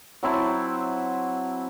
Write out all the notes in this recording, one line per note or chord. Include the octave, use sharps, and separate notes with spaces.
F#3 C4 E4 A5